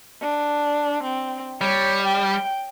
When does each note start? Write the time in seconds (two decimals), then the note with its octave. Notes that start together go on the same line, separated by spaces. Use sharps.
0.22 D4
1.03 C4
1.61 G3 C#5
2.02 G5